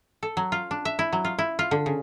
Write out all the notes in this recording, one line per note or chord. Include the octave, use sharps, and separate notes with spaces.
A4
F#3
F4
D4
E5
E4
F#3
F4
E4
F4
D3
C#3